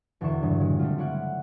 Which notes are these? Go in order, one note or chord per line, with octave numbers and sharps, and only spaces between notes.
E1 E2 D3 E3 C#6 E7
G2 C#3 E3 F#3 G3
A#2 G3 G#3
G3 A3 C4 F4
E4 F4 C#5 D5 F#5